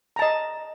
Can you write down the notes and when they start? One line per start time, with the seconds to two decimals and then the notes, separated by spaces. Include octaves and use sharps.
0.16 A#5
0.19 A5
0.22 D#5